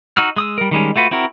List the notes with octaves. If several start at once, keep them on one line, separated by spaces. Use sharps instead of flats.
D#4 F#4 E6 F6
G#3 D#6 E6
G3 A#4
D#3 G3 G#3 C#4
A3 F4 F#4 B4
C4 E4 F#4 A#4